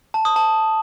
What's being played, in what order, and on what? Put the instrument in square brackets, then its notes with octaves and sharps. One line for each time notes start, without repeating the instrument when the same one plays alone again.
[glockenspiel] A5
D#6
A5